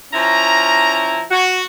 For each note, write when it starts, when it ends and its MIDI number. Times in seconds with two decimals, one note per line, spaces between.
0.13 1.23 53
0.13 1.23 61
0.13 1.23 64
0.13 1.23 82
1.31 1.63 66